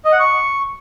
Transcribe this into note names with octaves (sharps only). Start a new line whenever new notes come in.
D#5
F#5
C#6